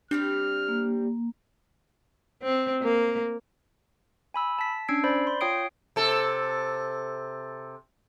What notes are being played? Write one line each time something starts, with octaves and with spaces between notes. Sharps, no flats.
G3 C4 D4 G4 F6
A#3
C4
A#3
G#5 B5 E6
A5 B6
C#4 D4 E6 G#6 C7 D7
C5 D5 B5
C6
F4 C#5 G5 D#6 C7 D7
C3 A4